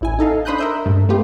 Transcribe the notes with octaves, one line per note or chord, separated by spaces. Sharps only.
A1 E4 G#5
D#4 A4 D#5 F5
D4 C5 B5 D#6 F#6 G6
A#4 E5 G6
G2 A3
A3 B3 F4 G4